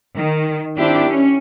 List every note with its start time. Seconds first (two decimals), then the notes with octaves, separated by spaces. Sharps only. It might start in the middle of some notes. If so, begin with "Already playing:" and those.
0.14 D#3
0.77 D#3 C4 D4 E4 G4
1.08 C#4